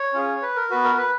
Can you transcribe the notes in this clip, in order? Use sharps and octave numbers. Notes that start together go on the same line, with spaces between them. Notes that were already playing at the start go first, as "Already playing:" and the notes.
Already playing: C#5
C#4 F4 G#4
B4
A#4
B3 F#4 B4
A#4
B4